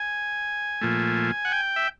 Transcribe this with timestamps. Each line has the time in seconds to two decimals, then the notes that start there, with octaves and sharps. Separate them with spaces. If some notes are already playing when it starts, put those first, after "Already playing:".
Already playing: G#5
0.81 A#2 F3 A3
1.45 F#5
1.52 G5
1.76 E5